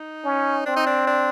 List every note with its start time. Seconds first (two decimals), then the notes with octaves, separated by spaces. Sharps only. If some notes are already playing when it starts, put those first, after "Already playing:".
Already playing: D#4
0.24 C#4
0.66 C4 D4
0.76 D#4
0.86 D4
1.07 D4